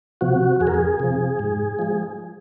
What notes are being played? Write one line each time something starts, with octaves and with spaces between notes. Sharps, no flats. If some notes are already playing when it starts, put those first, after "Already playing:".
C3 F3 F#4
F2 G#4
A#4
G#4
C3 F3
G#2
F3 G#3